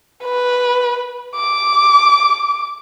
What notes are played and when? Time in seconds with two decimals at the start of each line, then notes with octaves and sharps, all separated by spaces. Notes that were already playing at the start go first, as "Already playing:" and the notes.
0.24 B4
1.36 D6